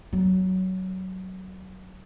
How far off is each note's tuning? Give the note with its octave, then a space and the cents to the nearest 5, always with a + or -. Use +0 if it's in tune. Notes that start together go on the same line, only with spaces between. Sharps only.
F#3 +15